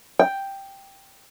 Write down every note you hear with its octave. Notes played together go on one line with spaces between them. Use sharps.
G5